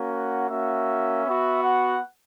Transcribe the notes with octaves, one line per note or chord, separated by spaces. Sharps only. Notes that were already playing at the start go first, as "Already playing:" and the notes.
Already playing: A#3 C#4 F#4
F#5
A#3 C#4 F#4 E5
B3 F#4
F#5